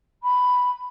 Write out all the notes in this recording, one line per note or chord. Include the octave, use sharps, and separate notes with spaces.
B5